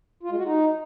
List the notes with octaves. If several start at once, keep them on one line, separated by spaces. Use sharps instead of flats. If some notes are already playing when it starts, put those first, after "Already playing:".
F4
G#3
F#4
D#4